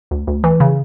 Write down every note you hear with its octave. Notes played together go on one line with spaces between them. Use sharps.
D2
D2
E3
C#3